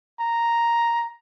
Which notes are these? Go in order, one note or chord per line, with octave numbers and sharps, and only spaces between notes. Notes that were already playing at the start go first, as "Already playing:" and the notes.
A#5